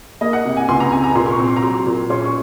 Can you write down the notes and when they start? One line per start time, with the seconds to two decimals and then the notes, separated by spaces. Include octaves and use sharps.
0.21 A#3 D#5
0.33 F#5
0.45 C3
0.57 G#5
0.68 C#2 C6
0.80 A#5
0.92 C3 G#5
1.04 A#5
1.15 A#2 C6
1.26 C6
1.31 C#6
1.40 C4
1.48 C6
1.56 A#5
1.63 F#3 C6
1.86 A#2
2.10 C#4 C6
2.25 C#6